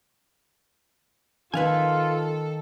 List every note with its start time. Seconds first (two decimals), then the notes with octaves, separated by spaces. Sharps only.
1.54 D#3 F4 A4 B4 F5 G#5